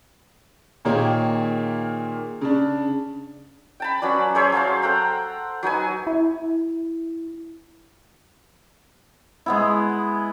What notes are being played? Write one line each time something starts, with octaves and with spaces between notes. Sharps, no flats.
A#2 D#3 A#3 G#4 C#5 G5
C#3 D4
G5 A5 B5
F#3 C#4 B4 D5
G#4 C5 C#5 E5
F#3 C5 F5 A5
A4 F#5 G5 A#5
F#3 D#4 B4 G#5
E4
G#3 B3 E4